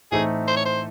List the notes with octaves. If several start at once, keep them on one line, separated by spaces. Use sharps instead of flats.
A2 E3 A3 C4 D#4 G#4
C5
C#5
C5